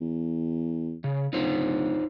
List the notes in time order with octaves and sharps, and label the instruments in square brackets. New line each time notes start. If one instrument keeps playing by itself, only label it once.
[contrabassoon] E2
[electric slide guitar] C#3
[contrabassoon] D1 [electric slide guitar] D#4 F4 C5